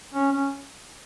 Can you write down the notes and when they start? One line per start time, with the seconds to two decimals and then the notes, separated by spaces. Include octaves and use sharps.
0.14 C#4
0.32 C#4